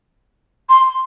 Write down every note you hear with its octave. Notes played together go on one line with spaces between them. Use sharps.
C6